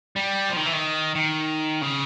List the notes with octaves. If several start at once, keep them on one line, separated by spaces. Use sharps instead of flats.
G3
F3
D#3
E3
D#3
D#3
C#3